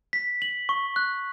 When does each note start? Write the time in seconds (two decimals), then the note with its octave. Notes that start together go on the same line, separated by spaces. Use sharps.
0.13 B6
0.42 F#7
0.69 C#6
0.96 F#6